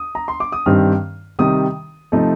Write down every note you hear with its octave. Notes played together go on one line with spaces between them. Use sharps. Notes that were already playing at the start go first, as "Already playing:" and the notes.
Already playing: D#6
A#5
C6
D6
D#6
G2 D#3 G3 C4 F6
C3 D#3 G3 D#6
C3 F3 A3 D#4